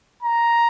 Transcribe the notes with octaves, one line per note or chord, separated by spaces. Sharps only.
A#5